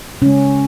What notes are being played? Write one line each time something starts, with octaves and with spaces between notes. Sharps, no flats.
C#3 G#3 C#4